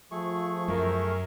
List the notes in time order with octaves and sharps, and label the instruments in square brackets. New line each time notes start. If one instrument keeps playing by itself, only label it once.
[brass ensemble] F3 [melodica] A3 G#4 C#6
[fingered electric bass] F#2 [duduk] A#4